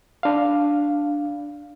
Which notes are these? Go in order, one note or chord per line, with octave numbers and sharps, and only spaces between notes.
D4 F5